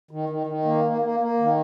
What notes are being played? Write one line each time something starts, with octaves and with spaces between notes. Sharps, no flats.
D#3
D#3
D#3
A#3
A#3
A#3
A#3
D#3